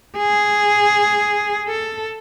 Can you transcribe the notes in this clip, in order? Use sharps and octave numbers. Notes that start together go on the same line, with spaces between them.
G#4
A4